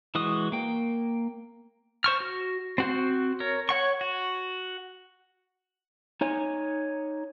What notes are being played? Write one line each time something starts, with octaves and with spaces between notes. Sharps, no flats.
E3 G#3 F#4 D#6
A#3 G5
C5 C#6 F6
F#4
C4 F#4 C5
A#4 C#5
C#5 F#5 C#6
F#4
D#4 C#5 G#5